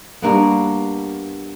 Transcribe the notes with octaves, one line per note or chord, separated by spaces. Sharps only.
G2 A#3 B3